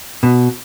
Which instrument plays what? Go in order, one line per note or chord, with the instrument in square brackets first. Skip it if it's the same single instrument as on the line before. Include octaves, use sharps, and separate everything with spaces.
[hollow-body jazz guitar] B2